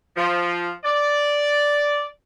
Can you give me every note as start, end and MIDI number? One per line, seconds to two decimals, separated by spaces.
0.16 0.69 53
0.85 2.03 74